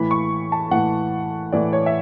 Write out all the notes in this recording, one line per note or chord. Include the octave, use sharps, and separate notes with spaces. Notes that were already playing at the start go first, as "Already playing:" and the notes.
Already playing: A2 E3 B5
C#6
A5
A2 E3 F#5
A2 E3 D5
C#5
E5